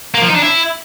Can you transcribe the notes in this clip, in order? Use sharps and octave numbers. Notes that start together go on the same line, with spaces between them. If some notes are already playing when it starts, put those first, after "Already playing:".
A#3
F3
D#4
D4
E4